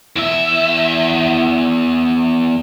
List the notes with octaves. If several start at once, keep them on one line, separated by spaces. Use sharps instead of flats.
E2 E5